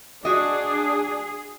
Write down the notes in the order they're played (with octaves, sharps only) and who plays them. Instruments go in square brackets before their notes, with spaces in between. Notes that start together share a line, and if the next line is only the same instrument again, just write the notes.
[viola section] D4 [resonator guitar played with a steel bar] F#4 D#5 [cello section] G#4